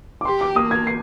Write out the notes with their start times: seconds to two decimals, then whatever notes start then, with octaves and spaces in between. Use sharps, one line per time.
0.21 D6
0.25 G4 C6
0.41 D6
0.56 A#3 D#6
0.71 G#6
0.87 C7